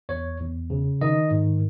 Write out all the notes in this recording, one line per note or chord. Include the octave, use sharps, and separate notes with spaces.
E2 C#5
E2
C#3
D#3 D#5
G#2